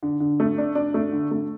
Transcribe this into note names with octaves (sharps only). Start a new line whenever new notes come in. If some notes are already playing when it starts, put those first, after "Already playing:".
D3
D3
A3
D4
D4
A3
D3
A3